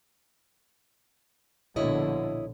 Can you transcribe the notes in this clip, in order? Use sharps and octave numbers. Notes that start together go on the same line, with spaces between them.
A#1 B2 D3 E4 C#5 D#5